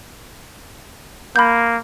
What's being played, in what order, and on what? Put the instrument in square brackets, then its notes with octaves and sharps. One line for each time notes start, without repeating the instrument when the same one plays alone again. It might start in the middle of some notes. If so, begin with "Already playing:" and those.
[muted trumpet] A#3 [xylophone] B5 G6